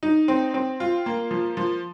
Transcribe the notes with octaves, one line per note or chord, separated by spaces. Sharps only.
D#4
C4
C4
F4
A#3
F3
F3